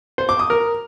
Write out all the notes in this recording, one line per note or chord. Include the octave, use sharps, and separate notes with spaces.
C5
D6
D#6
A#4